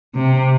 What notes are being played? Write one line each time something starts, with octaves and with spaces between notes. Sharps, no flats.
C3